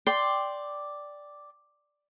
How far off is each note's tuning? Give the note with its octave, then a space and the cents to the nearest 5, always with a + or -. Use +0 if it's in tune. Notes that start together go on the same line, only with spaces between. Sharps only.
D5 +0 G5 +0 C6 +0